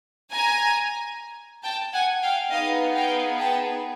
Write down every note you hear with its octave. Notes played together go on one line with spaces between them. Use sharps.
G#5 A#5
G5 A5
F#5 G#5
F5 G5
B3 D#4 G#4 D#5 F5
F5 G5
G5 A5